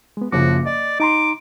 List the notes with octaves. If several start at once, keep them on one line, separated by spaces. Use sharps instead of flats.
G#3 B3
F#1 C#3 F3 F#4 D6
D5 D#5
D#4 A#5 C6 D6